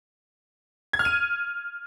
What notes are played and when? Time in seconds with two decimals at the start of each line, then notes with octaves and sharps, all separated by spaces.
0.93 G#6
0.99 F6
1.05 D#7